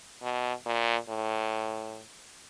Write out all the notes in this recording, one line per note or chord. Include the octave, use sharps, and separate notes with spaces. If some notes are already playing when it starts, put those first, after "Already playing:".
B2
A#2
A2